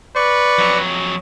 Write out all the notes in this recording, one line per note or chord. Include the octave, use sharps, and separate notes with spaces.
B4 D5 C#6
F2 F#3